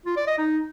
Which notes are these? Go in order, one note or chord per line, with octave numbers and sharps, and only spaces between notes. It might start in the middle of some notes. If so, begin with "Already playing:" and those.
F4
D5
D#5
D#4